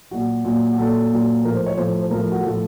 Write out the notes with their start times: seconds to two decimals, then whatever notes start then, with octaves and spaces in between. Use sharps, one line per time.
0.11 A#2 F#3 F#4
0.45 A#2 F#3
0.72 F#4
0.78 A#2 F#3 A4
1.12 A#2 F#3
1.44 A2 F3 A#4
1.55 C5
1.66 C#5
1.77 A2 F3 C5
2.00 C5
2.10 A2 F3 A#4
2.32 F#4
2.43 A2 F3 A4